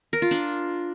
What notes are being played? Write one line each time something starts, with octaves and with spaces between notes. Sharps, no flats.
A#4
F4
D4